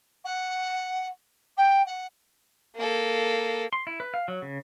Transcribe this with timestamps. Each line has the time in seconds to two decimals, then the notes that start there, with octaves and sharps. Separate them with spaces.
0.24 F#5
1.57 G5
1.86 F#5
2.75 A#3 A4
3.73 C6
3.87 E4
4.00 B4
4.14 F5
4.28 F#3
4.42 C#3